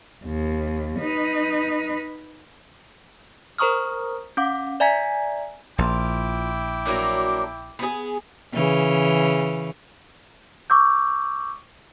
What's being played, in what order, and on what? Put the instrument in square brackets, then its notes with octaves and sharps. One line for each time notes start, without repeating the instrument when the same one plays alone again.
[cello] D#2
D#4 B4
[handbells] A#4 C5 A#5 C#6 D#6 F6
C#4 F5 F#5 D6
D5 E5 G#5 A#5 G#6 B6
[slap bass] A#1 [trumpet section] E4 G5 D6 [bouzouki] F4
[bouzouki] F#3 A#3 D4
B3 G#4
[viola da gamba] C#3 E3
[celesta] C#6 D6 E6 G6